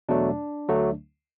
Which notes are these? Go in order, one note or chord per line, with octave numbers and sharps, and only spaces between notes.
E2 B2 F#3 A3 D4
D2 D3 F#3 A3